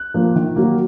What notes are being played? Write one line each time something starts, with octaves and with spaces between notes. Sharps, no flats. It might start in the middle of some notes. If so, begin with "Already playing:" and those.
Already playing: F#6
F3 A#3
D#3
F#3 A#3